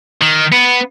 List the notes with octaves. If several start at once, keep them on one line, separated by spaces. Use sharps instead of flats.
D#3
B3